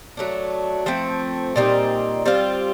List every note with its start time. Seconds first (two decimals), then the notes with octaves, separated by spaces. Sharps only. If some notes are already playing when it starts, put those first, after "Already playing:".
0.17 F#3 A3 D4
0.86 F3 A3 C4
1.56 A#2 G3 C4 D#4
2.26 G3 C4 F4